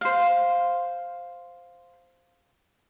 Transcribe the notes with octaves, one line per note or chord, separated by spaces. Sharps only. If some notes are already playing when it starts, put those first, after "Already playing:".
C5 F5